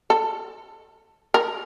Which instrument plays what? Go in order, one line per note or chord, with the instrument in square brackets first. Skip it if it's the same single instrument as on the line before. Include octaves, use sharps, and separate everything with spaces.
[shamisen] A4
A#4